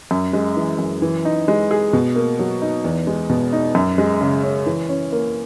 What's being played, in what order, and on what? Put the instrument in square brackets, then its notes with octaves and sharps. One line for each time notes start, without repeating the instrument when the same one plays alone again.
[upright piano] F#2
G#3
E3
F#2
E3
D#4
G#3
G#4
B2
A#3
F#3
D#4
E2
G#3
B2
D#4
F#2
G#3
C#3
C#4
E3
C#4
A#3